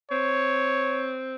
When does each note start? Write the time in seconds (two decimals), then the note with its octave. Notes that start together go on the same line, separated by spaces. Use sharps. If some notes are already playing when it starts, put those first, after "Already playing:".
0.11 C4 C#5